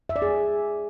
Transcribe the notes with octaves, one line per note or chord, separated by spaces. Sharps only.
E5
D5
G#4